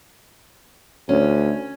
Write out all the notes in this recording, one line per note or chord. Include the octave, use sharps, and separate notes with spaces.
D2 C#4